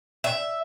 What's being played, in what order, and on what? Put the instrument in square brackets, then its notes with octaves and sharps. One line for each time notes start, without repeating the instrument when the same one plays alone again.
[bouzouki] E5